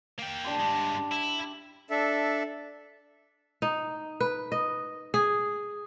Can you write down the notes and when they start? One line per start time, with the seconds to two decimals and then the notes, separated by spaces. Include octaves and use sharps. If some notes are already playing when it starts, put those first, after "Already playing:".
0.19 A#3 G5
0.45 D4 G4 C6
0.60 G2 G#3
1.12 E4
1.90 D4 A4 E5
3.62 D#4
4.20 B4
4.52 D#5
5.14 G#4